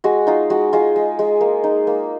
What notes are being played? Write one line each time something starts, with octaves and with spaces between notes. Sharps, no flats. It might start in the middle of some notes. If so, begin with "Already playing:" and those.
G#3 F#4
D#4 F4
G#3 F#4
G#3 F4
G#3
G#3
A#3
D#4
A#3